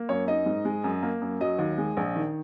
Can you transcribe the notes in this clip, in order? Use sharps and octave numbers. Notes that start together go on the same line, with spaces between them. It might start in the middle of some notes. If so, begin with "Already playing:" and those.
Already playing: A#3
F#2 C#5
D#4 D#5
G#2
G#3
F#2
A#3
F#2
F#3 D#5
D#2
G#3
A#1
D#3